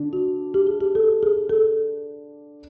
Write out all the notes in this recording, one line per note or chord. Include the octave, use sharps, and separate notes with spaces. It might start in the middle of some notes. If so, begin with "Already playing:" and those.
Already playing: D3 D4
F#4
G4
G#4
G4
A4
G#4
A4